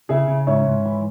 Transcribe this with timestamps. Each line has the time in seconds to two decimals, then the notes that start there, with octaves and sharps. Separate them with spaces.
0.09 C#3 E4 G#4
0.28 C#3
0.47 G#2 C#4 E4
0.67 G#2
0.86 E3